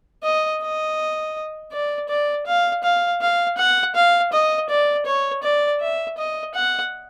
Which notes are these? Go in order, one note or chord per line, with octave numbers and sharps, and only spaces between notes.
D#5
D#5
D5
D5
F5
F5
F5
F#5
F5
D#5
D5
C#5
D5
E5
D#5
F#5